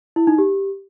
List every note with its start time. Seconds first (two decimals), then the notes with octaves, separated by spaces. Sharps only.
0.16 E4
0.27 D#4
0.38 G4